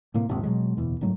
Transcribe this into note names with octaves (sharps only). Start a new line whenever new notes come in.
A2 C3 A#3
D#1 A#1 G#2 C3
B2 D3 F#3 G#3
D1 E2 B2
F#1 G#2 F#3 A3